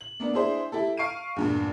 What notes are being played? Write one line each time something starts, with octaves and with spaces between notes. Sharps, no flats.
F#7
A#3 B3 D4
D4 E4 G#4 C5
E4 G4 A4
F5 C#6 C7 D7 D#7
E2 G2 A#2